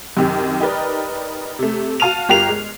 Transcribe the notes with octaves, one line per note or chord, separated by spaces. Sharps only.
F#2 C3 D#3 G4
D#4 G4 A#4 B4 D5
C3 A3
F#4 F5 A5 F6 D#7 F7
G1 F4 G4 A#4 C7 F7
G#3